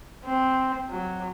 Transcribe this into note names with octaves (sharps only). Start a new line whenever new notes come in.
C4
F#3